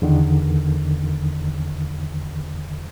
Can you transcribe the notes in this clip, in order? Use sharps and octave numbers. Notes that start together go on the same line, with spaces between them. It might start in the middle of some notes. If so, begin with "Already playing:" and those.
E2 D3 D#3